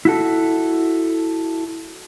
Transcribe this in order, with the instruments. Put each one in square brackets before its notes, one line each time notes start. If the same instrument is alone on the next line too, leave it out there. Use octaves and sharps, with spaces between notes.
[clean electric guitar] E4 F#4 A4